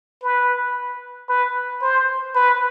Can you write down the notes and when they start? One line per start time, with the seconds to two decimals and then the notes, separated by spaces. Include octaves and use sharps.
0.22 B4
1.29 B4
1.82 C5
2.35 B4